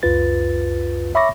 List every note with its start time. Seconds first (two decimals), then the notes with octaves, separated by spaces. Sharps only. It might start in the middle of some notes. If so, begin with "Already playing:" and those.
0.03 C#2 F#2 F4 B4 A6
1.15 C#5 E5 B5 C#6 D6 A#6